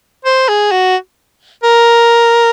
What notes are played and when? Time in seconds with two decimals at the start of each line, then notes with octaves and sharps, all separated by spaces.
0.25 C5
0.48 G#4
0.72 F#4
1.63 A#4